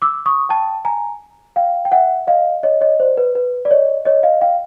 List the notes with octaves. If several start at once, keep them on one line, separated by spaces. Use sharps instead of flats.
D6 E6
C#6 D#6
G5 A5
G#5 A#5
F5 G5
G5
E5 F#5
D#5 F5
C#5 D#5
C#5 D#5
C5 D5
B4
B4
D5
C#5 D#5
C#5 D#5
D#5 F5
F5 G5